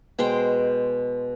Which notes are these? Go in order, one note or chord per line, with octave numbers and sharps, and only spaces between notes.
B2 G#3 C5 G5